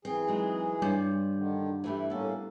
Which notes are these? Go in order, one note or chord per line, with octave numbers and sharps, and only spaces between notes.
E3 C4 G#4
F#3 G#3 D#4
G2 G3 C#5 D5
D3 D#3
E3 A3 E4 G4
A2 A#3 B3 C#4 A4